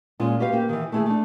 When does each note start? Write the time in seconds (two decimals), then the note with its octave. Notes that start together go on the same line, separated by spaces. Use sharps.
0.20 A#2 G#3 C#4 F4
0.39 F#4 G4 B4 F5
0.53 A#3 G4
0.69 D#3 E3
0.92 A3 E4 G#4
1.06 A3 D4